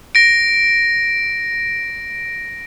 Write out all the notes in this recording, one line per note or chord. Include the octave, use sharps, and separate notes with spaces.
A#6 D7